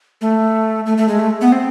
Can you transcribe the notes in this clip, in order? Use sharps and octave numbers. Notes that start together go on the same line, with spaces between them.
A3
A3
A3
G#3
A3
B3
C4